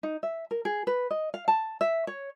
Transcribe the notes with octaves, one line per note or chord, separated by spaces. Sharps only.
D#4
E5
A#4
G#4
B4
D#5
F5
A5
E5
C#5